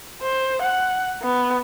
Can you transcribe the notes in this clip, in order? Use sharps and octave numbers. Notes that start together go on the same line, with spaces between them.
C5
F#5
B3